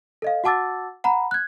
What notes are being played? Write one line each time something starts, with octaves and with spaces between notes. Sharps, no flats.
A4 D#5 F5
F#4 F#5 A5 D6 E6 A6
F#5 A#5 B5
F#6 G#6